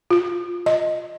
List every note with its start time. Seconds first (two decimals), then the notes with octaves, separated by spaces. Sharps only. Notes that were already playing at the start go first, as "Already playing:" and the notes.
0.11 F4
0.66 D#5